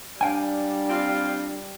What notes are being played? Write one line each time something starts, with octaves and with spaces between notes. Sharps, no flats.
G3 D4 F5 G5 G#5
C4 F4